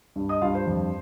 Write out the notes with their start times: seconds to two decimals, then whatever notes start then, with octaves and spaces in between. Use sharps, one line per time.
0.16 G2
0.29 D#5 D#6
0.42 G2 F4 F5
0.55 C5
0.67 F2